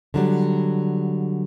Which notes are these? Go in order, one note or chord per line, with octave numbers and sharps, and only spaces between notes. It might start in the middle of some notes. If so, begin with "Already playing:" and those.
D3 F#3 G3